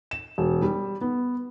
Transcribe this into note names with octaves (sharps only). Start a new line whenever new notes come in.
E7
E1
G3
B3